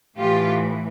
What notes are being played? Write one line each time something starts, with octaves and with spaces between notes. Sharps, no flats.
A2 E3 F4 G4